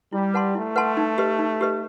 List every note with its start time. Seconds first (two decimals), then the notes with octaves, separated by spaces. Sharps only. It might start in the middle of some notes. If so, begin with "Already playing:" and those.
0.13 G3 E4
0.34 B4 F#5 A5 C6
0.55 A3 E4
0.76 B4 F#5 A5 C6
0.97 D#4
1.18 G4 B4 D#5
1.39 D#4
1.61 G4 B4 D#5